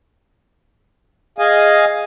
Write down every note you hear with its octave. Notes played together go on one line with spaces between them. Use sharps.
G#4 D#5 F5 G#5